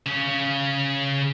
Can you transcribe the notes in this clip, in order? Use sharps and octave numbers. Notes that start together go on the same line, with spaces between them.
C#3 C#4